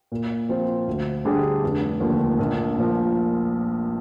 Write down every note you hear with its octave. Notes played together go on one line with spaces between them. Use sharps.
A#2
F3 C4 F4 C5
D2
D3 G3 D4 G#4
F1
D#2 D3 F3
A#1
A#2 F3